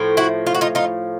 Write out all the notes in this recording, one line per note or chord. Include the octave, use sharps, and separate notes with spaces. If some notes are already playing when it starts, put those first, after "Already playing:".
Already playing: A2 F3
E4 F#4
F4
F#4
D#4 F4
D#4 F4